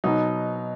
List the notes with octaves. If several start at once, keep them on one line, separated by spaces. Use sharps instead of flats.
B2 F#3 D#4